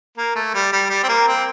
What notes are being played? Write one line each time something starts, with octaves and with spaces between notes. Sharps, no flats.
A#3
A3
G3
G3
G3
C4
A#3
C4